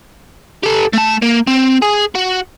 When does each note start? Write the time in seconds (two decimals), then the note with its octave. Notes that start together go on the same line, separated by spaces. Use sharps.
0.64 G4 A4
0.93 A3 A5
1.22 A#3
1.47 C4
1.82 G#4
2.15 F#4